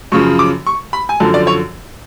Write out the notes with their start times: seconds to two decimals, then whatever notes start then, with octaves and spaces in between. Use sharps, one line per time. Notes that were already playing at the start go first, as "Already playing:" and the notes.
0.12 F#2 C#3 F3 C#6
0.39 D6
0.67 C#6
0.93 B5
1.09 G#5
1.20 F#2 D3 F3 A5
1.34 D5
1.47 C#5